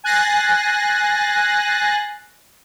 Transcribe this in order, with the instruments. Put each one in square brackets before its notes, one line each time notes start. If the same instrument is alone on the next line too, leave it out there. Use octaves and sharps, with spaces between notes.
[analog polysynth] G#5 F#6 A6 A#6 C7